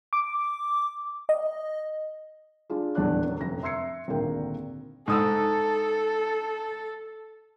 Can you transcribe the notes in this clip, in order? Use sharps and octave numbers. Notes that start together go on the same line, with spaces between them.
D6
D#5
D4 F4 G#4
D#1 A1 E2 D4 C#5 F#6
F#2 D3
F1 F2 A#6
E5 C6 E6 G#6 C7 C#7
G#1 D2 A#2 A#4 G5
G#2 A4 D#6 E6